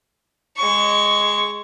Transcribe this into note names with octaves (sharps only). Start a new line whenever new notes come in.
G#3 C#6